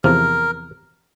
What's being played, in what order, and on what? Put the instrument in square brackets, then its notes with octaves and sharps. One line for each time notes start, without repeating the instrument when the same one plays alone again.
[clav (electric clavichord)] E2 C3 F3 [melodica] A#4